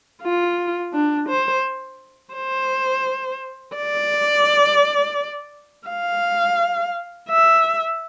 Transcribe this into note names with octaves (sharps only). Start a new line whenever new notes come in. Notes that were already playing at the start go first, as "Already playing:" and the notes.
F4
D4
C5
C5
D5
F5
E5